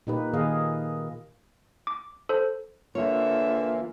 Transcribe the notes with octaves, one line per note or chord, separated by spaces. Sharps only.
A#2 A#3 D#4 G4 B4
A#2 D#3 G#4 D#5 F5
D6
A4 C5
D3 E3 A#3 F4 C#5 E5